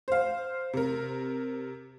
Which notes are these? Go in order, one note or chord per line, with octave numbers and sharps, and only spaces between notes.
C5 F5
C3 A#4